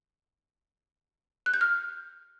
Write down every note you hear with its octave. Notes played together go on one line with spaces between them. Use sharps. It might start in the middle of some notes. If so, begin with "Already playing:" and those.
F#6
G6
F6